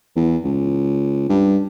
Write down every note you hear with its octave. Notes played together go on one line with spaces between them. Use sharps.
E2
C#2
G2